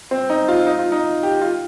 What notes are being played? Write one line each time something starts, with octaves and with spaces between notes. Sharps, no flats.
C4
D#4
F4
D#4
F4
D#4
G4
F4